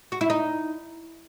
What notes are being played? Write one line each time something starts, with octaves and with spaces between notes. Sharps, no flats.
F#4
E4
D#4